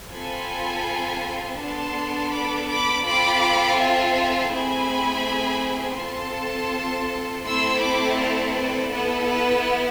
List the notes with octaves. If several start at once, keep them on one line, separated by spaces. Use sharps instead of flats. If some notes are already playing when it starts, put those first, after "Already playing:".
C4 F4 A4 G#5 B5
B3 D4 A4 A5 C6
B5 D6
B5 D6
C4 F4 A4 B5 D6
E5 G#5
A3 C4 E4 G#4 G#5 B5
C4 F4 A4 A5 C6
A3 C4 E4 A4 C6 E6
B5 D6
D5 F5
B4 D5
B3 E4 A4 B4
B4